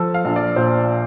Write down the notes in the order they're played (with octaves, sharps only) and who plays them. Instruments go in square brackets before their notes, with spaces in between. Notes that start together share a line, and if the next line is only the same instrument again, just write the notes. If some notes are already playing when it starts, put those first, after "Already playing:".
Already playing: [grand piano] F3 A4
F5
A#1
D5
A#2 C5